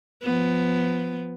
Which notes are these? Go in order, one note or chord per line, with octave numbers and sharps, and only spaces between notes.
F3 B3